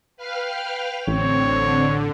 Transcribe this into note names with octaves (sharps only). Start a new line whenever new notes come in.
B4 F5 G5 F6
A1 D3 C4 C#5